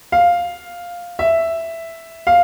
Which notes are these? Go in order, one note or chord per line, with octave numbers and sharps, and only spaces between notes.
F5
E5
F5